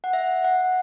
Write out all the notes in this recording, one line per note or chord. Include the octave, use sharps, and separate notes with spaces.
F#5
E5
F#5